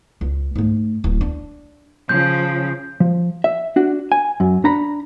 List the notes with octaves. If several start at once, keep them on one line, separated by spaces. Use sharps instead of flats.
C#2
G#2 A3
D1
D4
C#3 F3 G6
F3
E5
D4 F#4
G#5
F#2
D4 A#5 B5